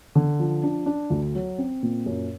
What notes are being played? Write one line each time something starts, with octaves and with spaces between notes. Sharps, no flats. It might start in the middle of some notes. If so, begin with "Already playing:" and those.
D3
F3
D4
D4
D2
F#3
C4
A#2
F#2